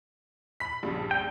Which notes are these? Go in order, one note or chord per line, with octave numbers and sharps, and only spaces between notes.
B5 B6
A#1 G2 C#3
G5